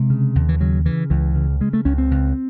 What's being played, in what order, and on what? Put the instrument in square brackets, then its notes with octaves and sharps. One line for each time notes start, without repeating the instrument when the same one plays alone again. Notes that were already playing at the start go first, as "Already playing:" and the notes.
Already playing: [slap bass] C3 G#3
C#3
D#2
E3
C#3 F#3
C#3 E3
C#2 E3
C#3
C#3 G#3
A3
C#2 C#4
C4
C#2